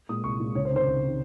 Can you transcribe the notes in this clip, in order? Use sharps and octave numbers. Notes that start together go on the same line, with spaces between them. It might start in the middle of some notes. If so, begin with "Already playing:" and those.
A#2 G#3 D#6
C2 C#6
A#2 G#3
C#2 C#5
C5
C3 D#3
C5
C#2
C3 D#3